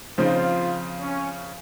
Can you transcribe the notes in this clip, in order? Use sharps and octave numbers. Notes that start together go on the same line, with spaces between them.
C#3 F3 C4 D#4 F4
C#4